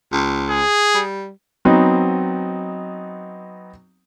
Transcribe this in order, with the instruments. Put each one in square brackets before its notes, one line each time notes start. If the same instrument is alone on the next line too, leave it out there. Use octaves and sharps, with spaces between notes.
[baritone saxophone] C#2
[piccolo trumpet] G#4
[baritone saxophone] G3
[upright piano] F#3 B3 C4 D#4